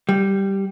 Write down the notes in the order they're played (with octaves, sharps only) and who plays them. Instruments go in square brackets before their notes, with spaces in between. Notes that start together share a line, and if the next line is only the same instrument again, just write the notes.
[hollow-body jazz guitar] G3